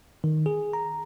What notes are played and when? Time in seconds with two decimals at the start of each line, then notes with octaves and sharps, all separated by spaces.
0.24 D#3
0.46 G#4
0.73 A#5